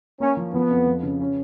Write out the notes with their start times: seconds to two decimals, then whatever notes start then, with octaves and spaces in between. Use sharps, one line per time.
0.20 A#3 C#4
0.37 F3
0.53 F3 B3
0.70 F2
0.87 F3
1.03 C#3
1.20 C#4